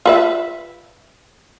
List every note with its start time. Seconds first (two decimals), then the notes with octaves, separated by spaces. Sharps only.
0.06 F4 B4 E5